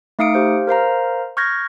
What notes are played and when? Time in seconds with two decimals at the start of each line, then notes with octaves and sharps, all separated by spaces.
0.19 A3 D#4 F5 D#6 C#7 D7
0.34 G4 C5 F5
0.67 A#4 C5 F5 A#5
1.37 C#6 F6 G6 G#6 A#6